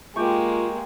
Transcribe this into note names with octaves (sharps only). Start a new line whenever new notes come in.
G#3 A#3 F4 G4 G5 C#6